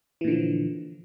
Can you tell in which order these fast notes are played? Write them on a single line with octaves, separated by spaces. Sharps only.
E3 A#2 D3 F3